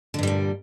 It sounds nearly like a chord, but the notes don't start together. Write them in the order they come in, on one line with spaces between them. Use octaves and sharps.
D3 G2 G3 A#2